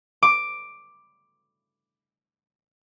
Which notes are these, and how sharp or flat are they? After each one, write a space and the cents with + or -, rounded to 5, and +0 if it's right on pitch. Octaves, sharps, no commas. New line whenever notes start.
D6 +5